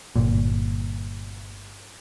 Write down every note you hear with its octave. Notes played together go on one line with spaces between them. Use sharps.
G1 A#2